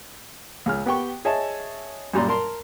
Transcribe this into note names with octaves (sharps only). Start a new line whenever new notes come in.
C#2 G#4 F6
B3 G4 G5 C#6
G#4 C#5 D#5 E5 A5
F#2 A#2 G3 A#5 C6
A#4 A5 C6